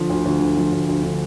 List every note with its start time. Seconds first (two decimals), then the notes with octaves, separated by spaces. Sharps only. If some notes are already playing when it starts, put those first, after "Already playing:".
Already playing: D3 F3
0.10 D2
0.25 D2
0.41 D3
0.57 F3
0.72 D2
0.89 D2
1.04 D3